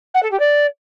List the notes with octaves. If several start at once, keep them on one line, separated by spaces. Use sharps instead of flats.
F#5
A4
G4
D5